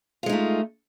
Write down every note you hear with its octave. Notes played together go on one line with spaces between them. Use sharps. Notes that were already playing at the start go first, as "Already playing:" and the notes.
G#3 A3 D#4 F4